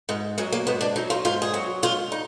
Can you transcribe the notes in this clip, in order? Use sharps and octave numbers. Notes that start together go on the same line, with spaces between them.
G#2 G#3
F#3 G#3
A#3
G#2 B3
D4
F#3 D#4
F4
G#2 F4
G#4
F#3 F#4
G#2 F4
D#4